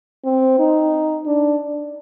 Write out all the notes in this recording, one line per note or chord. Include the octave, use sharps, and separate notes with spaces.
C4
D#4
D4